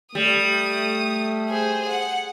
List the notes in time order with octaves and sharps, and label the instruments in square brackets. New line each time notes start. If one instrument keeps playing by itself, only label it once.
[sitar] G3 [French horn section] A3 [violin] D#6
[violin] G#4 C5
F#5